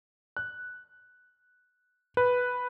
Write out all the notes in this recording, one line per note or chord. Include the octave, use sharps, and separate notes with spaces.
F#6
B4